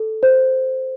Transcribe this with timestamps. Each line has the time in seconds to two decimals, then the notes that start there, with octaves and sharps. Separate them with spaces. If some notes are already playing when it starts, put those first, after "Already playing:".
Already playing: A4
0.23 C5